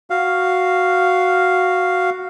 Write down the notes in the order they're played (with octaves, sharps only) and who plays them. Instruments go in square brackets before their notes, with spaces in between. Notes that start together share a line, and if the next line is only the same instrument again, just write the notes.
[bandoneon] F#4 F5